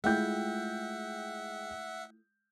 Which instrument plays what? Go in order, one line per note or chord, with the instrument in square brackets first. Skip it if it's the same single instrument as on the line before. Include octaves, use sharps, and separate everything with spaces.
[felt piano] G#3 G5 G6 [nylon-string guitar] A3 E4 F4 [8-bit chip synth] E5 F#5